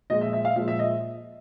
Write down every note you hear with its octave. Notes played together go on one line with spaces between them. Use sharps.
A#2 F3 G#3 D#5
E5
E5
F5
A#2 F3 G#3 E5
E5
D#5